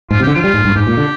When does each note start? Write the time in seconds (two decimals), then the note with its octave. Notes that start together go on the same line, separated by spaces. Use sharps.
0.11 G#2 F4
0.20 C3
0.23 D3 G4
0.34 F3 F4
0.44 G3
0.54 G#2
0.65 G2
0.76 G#2 G4
0.87 A#2
0.97 D3